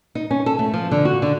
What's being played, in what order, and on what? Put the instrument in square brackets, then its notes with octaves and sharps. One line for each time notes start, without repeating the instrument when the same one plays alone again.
[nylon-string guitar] D#4
C#4
A4
A3
F3
D3
F#4
D3